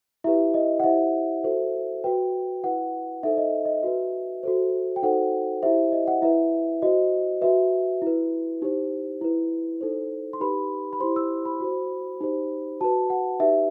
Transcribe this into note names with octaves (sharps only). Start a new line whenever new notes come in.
E4 G4 B4 E5
D#5
F#5
E4 G4 C5 E5
F#4 A4 C5
F#4 B4 G5
E4 B4 F#5
D#4 A4 C5 E5
D#5
D#5
F#4 B4 E5
F#4 A4 C5
G5
D#4 F#4 A4 C5 F#5
E4 G4 C5 E5
D#5
F#5
E4 B4 E5
F#4 C5 D#5
F#4 B4 E5
E4 B4
D#4 G4 C5
E4 B4
D#4 A4 C5
C6
D#4 G4 B4 B5
B5
E4 G4 C5 C6
E6
B5
F#4 C5
D#4 G4 C5
F#4 B4 A5
F#5
D#4 G4 B4 E5